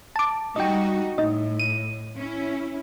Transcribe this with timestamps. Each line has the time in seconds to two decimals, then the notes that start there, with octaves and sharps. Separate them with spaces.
0.16 A5 D6
0.56 G3 D#4 F#4 D#5 G5
1.18 A2 D#4 D#5
1.60 D#7
2.16 C#4 E4